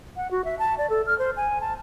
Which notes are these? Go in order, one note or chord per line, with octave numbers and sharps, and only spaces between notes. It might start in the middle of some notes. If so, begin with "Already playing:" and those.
F#5
F#4
E5
A5
D5
A4
F6
C5
G#5
A5